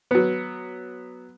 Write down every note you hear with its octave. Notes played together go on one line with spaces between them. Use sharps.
F#3 B3